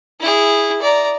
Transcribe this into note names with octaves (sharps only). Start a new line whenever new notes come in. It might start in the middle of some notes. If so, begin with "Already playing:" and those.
E4 G#4
D5 A#5